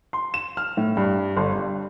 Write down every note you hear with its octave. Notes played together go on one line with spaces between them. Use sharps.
C6
E7
F6
A2
G2
G1
G2